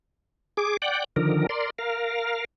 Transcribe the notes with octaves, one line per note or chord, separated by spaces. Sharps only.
G#4 D6
D5 F#5 G5
D3 D#3 F3 A#4
A#4 D5 C6
A#4 F5